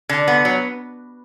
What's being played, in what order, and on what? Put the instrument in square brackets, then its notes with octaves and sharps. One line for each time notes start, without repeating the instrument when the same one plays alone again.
[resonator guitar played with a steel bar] D3
B3
F#3